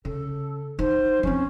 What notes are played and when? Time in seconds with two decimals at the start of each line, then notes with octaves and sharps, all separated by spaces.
0.05 C#3 A4
0.79 E3 D#4 C5
1.23 F3 C4 C#4